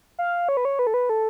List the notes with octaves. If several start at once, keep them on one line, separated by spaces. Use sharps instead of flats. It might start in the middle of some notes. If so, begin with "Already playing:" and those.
F5
C#5
B4
C#5
B4
A4
B4
A4